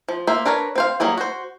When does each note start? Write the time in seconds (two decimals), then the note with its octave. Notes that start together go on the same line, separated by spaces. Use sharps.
0.09 F3
0.27 A#3 C5 E5
0.46 D4 A#4 B4 C#5
0.76 C4 C5 F5
1.00 F#3 G3 A#3 G#4
1.18 F#4 C5